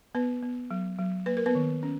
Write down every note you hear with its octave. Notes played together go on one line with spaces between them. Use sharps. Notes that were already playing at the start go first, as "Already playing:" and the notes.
B3 B4
B3
F#3
F#3
A#3 B4
A#4
B3 B4
D#3
C#4